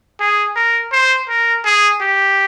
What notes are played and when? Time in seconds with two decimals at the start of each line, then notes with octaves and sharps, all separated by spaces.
0.20 G#4
0.56 A#4
0.92 C5
1.29 A#4
1.65 G#4
2.01 G4